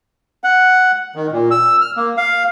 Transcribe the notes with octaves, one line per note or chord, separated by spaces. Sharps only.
F#5
D#3
A#2
E6
F6
A#3
F5